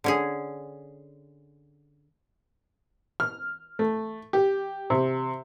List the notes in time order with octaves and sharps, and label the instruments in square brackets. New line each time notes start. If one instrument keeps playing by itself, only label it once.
[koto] D3 C#4 G#4
[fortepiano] F6
A3
G4
C3